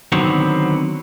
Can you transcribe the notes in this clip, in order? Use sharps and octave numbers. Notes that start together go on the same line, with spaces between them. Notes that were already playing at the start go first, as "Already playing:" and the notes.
D3 D#3 F#3 B3 C4